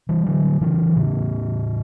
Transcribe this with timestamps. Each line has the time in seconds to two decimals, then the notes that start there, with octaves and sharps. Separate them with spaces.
0.09 E3 G3
0.26 D3 F#3
0.61 C#3 E3
0.96 A2 C#3